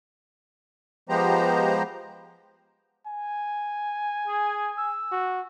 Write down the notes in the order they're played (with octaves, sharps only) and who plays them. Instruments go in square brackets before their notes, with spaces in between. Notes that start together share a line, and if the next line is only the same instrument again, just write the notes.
[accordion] F3 G#3 B3 G4 C5 A#5
[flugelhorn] G#5
[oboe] G#4
E6
[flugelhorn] F#4